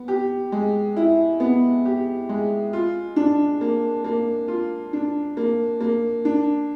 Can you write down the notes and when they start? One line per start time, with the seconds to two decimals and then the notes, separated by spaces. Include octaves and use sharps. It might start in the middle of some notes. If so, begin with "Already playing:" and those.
Already playing: B3
0.08 G4
0.52 G#3
0.97 E4
1.40 B3
1.85 G4
2.29 G#3
2.73 F4
3.16 D4
3.61 A#3
4.04 A#3
4.48 F4
4.93 D4
5.37 A#3
5.81 A#3
6.25 D4